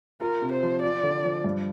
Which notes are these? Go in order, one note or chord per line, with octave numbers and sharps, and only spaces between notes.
F4 A#4
C3
C5
F3
F4 D5
D3
F3
G2